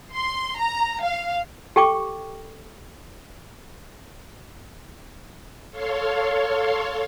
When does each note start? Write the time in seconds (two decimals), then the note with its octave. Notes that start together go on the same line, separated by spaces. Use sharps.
0.14 C6
0.59 A#5
1.03 F5
1.76 G4 A4 G5 C#6 D6
5.71 A4 C#5 F5 C6